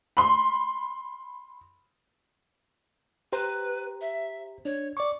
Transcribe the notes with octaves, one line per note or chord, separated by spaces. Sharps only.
B5 C6
G4 B4 C5 A#5
E5
D4 C#5
D5 C#6 D6